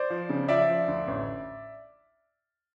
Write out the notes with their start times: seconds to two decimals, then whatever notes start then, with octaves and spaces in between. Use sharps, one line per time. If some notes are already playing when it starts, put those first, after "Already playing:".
Already playing: C5 D5
0.10 F3
0.29 C#3
0.48 F3 D5 E5
0.69 F3
0.88 D2
1.07 A1